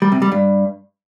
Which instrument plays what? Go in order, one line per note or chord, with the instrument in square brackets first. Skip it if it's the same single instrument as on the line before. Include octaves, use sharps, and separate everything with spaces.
[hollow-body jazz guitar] G3
C3
G3
G2